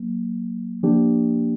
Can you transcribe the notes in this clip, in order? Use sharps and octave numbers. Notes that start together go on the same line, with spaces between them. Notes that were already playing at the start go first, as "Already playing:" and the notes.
Already playing: F#3 A#3
F3 A#3 D4 G4